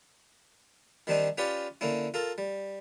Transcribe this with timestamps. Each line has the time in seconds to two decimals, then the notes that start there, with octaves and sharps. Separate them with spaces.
1.07 D#3 G3 C4 D4 D#4
1.38 C#4 F4 G4 B4 C#5 D5
1.81 D3 A#3 C#4 E4
2.14 F4 A4 A#4
2.38 G3